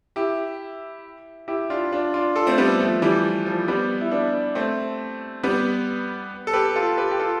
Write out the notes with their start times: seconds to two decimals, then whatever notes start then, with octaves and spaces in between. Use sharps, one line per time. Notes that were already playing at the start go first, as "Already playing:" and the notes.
0.16 E4 G4
1.48 E4 G4
1.70 D4 F4
1.92 D4 F4
2.14 D4 F4
2.36 F4 A4
2.47 A3 C4
2.58 G3 B3
2.80 F3 A3
3.02 E3 G3
3.46 F3
3.68 G3 B3
4.01 E4
4.11 B3 D4
4.55 A3 C4
5.43 G3 B3
6.47 A4
6.53 G4 B4
6.76 F4 A4
6.98 G4 B4
7.11 G4
7.20 F4 A4